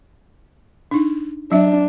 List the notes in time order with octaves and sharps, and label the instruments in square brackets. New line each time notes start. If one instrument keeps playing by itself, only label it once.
[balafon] D4 D#4
[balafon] F#3 E5 [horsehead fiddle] D4